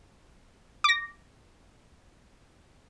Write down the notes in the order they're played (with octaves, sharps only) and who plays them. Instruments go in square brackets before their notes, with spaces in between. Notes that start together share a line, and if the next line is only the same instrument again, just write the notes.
[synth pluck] D6 A#6